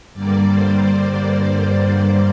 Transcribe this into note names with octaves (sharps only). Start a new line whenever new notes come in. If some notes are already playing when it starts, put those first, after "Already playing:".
G2 D3 G3 A#3 D5
C5